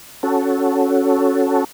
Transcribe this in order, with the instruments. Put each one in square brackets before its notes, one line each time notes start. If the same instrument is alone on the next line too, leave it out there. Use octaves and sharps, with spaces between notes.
[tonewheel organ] C#4 F#4 A4